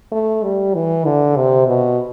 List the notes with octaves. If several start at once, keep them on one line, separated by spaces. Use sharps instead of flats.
A3
G3
E3
D3
C3
B2